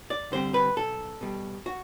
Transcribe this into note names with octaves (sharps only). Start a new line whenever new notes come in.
D5
D3 G3 C4 C5
B4
B1 A4
B2 G3
F#4